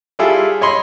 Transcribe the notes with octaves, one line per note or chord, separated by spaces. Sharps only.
G3 E4 F4 G#4 A4
C#5 D#5 B5 C6